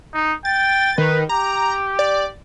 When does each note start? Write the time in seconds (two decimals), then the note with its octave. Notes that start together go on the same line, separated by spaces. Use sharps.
0.14 D#4
0.45 G5 A6
0.98 D#3 B4
1.29 G4 A#5
1.99 D5